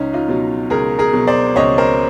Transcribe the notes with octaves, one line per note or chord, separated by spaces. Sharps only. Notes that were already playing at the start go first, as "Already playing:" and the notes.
Already playing: C#2 C#4 D#4
D#4 F4
B2 F#3
C#2 G#4 A#4
G#4 A#4
B2 F#3
C5 D5
C#2 C#5 D#5
A#4 C5